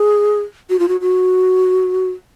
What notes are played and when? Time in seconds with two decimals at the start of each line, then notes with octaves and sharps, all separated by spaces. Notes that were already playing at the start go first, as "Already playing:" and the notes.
Already playing: G#4
0.70 F#4
0.79 F4
0.88 F#4
1.01 F#4